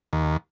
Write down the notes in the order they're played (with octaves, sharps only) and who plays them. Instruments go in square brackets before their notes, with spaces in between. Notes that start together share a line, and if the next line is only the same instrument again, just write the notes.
[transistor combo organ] D#2